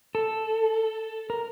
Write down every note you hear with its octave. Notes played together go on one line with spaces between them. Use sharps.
A4
A#4